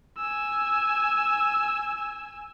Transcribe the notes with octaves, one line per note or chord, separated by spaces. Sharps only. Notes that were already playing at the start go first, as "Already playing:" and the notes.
G#5 E6